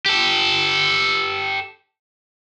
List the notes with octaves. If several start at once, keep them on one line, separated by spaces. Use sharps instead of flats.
G4 A4